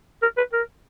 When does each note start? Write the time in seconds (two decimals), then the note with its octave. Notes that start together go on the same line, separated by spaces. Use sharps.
0.22 A#4
0.37 B4
0.53 A#4